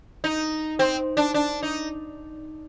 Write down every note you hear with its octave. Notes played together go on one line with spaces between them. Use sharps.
D#4
C4
D4
D4
D#4